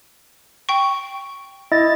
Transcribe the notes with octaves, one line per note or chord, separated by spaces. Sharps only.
G5 C#6
E4 D#5 A6